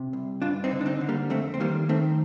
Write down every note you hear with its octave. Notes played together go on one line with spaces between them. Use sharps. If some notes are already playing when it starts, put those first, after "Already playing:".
Already playing: C3
C2
G2 D4 F4
C4 D#4
D3
D4
C4 D#4
D3
G3 A#3
F2 A3 C4
C4
D#3 G3 A#3
D#3 A3 C4